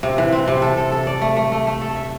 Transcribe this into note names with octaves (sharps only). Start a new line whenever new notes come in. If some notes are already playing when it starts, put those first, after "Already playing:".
C3
E3
C4
C3
A4
A4
A4
D5
A3
A3
A3
A3
A4
E5